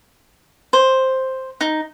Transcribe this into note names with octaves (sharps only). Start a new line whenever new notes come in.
C5
D#4